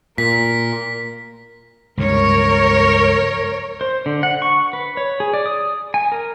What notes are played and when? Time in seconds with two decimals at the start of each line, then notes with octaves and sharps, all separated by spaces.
0.18 A#2 A#4 B6
1.98 C#2 G2 C#3 A#4 C#5
3.81 C5
4.06 D3
4.23 F#5
4.42 C#6
4.73 B4
4.97 C#5
5.20 G#4
5.34 D5
5.46 D#6
5.94 G#5
6.12 A#4